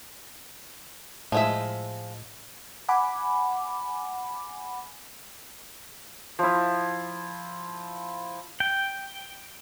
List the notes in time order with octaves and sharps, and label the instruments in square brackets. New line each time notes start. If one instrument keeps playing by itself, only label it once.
[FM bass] A2 [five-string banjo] F3 G#3 E5
[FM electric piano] F#5 G#5 B5 D6
[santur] F3 E4
[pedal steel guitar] G5